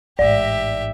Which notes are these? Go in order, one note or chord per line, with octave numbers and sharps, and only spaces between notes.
A1 G#2 G4 D5 E5